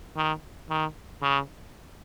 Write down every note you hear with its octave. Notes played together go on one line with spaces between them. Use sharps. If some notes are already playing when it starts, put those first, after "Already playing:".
D#3
D#3
C#3